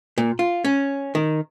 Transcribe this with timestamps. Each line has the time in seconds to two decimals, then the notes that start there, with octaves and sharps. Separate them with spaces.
0.18 A#2
0.39 F4
0.65 C#4
1.15 D#3